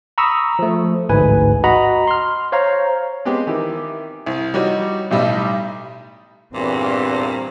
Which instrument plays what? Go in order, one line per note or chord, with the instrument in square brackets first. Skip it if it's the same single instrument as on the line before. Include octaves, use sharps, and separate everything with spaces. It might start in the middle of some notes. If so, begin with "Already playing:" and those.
[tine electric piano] A#5 B5 C#6 D#6 E6
F3 A3
A1 D2 G#2 B4 G#5
F#4 D#5 F#5 A#5 B5
C6 F6
C5 C#5 F5 A#5
[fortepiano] G#3 B3 C4 G4
D#3 E3 G4
C2
G3 D#4 F#4 C#5
B1 A2 G3 D#5 E5
[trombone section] E2 G2 E3 [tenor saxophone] A#2 [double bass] C4